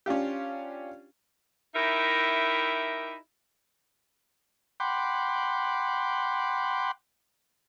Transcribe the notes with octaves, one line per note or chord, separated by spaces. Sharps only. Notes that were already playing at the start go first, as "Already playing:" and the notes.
C#4 D4 F4 G4
D#4 E4 G4 A#4 E5
F#5 G5 B5 C6 D6